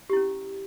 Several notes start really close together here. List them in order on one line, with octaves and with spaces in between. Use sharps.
G4 E4 C#4